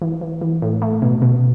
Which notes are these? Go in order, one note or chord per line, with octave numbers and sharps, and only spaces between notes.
E3
E3
E3
A2
A3
B2
B2